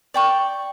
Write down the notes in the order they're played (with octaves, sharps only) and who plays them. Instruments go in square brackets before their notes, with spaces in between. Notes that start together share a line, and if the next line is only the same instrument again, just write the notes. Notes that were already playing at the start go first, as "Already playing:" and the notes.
[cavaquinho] D5 G5 C#6